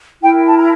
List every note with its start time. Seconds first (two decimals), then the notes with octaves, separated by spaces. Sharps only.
0.22 E4 A#4 G5
0.46 A5
0.58 A#5